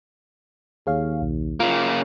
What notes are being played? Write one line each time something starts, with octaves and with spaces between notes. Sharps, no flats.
D#2 G#4 C#5 F5
B1
C#3 A#3 F4